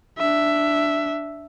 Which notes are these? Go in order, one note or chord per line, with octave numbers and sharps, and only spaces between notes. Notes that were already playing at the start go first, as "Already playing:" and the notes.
D4 E5